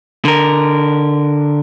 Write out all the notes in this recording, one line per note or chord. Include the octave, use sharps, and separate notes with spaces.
D3 A#4